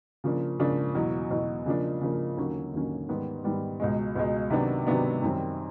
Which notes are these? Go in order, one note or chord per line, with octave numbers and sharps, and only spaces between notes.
C#3 F3 A#3 D4
C#3 F3 A#3 D4
E2 B2 F#3
E2 B2 F#3
C#3 F3 A#3 D4
C#3 F3 A#3 D4
D#2 D3 F#3 A#3 C#4
D#2 D3 F#3 A#3 C#4
G#2 D#3 G3 B3
G#2 D#3 G3 B3
C#2 B2 G#3
C#2 B2 G#3
C3 D#3 F#3 B3 D4
C3 D#3 F#3 B3 D4
F#2 D#3 G3 C4